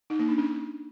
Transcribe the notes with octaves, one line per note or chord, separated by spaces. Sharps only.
D#4
A#3
D4
C#4